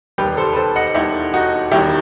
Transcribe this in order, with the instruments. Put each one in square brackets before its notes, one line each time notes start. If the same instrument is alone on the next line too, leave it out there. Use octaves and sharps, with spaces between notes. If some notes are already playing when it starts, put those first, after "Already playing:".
[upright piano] E1 D#2 D#3 G3 G4 B4
A4 C5
B4
A4 C5
D#5 F#5
E1 D#2 D#3 G3 E4 G4
D#4 F#4
E1 D#2 D#3 G3 E4 G4